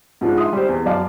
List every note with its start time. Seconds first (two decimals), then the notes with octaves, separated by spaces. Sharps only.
0.21 G#2 F3 D4
0.37 E5 C6 D#6
0.53 G3 G4 C5
0.69 E2
0.86 F#2 D5 F5 A5